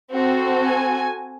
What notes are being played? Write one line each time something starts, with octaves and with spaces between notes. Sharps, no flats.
C4 F#4 A4
G#5